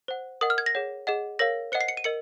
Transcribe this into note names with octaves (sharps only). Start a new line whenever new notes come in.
C5 F#5
A#4 D#5 F#5 D#6
F6
G#6
A#6
G#4 C#5 F#5
G#4 D#5 F#5
A#4 C#5 F5 A#6
C5 D#5 F#5 C#7
C7
C#7
D#7
A#4 D#5 C#7